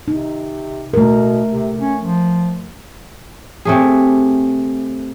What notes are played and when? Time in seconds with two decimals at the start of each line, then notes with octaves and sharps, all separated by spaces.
0.08 C3 D#4
0.94 B2 A3 A#4
1.48 C3
1.81 C#4
2.02 F3
3.65 C3 A3 G#4